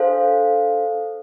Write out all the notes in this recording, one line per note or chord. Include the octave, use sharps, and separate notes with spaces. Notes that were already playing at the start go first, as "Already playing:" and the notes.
Already playing: D4 A4 C5 F5